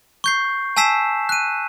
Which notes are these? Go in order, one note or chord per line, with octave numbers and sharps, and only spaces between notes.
C#6 G6 C7
G#5 A5 E6 B6 C7 E7
F#6 D#7